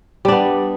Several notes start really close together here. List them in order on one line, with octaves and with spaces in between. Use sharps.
G3 D4 B3